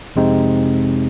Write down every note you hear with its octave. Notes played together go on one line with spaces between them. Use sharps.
F2 C3 G#3 C4 D#4